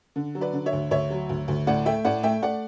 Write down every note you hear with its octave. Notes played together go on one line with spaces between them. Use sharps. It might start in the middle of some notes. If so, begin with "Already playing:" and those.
D3
F#3
B4 D5
D3
C#5 E5
D2
D2 C#5 E5
F#3
D2
D2
A2 D5 F#5
A3 E5 G5
A2 D5 F#5
A3 E5 G5
A3 D5 F#5